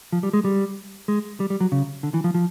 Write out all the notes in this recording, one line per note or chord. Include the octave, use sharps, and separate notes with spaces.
F3
G3
G#3
G3
G#3
G3
G3
F#3
C#3
D3
E3
F3
F3